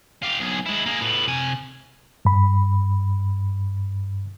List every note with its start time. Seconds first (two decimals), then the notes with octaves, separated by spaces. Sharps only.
0.23 F4 G4
0.40 B1 G#4
0.66 G#3 E4
0.86 A#3 G#4
1.01 A2 B3
1.28 C3 G#5
2.25 G2 B5